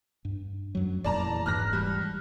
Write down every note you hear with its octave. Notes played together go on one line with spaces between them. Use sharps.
G2
F#2 F#3
F1 E2 A#2 D5 A5 A#5
E1 G#2 E3 F6 F#6 A#6
G3